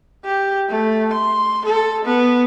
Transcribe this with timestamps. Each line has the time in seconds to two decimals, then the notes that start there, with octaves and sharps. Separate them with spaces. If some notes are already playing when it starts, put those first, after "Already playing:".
0.25 G4
0.69 A3
1.13 C6
1.66 A4
2.05 B3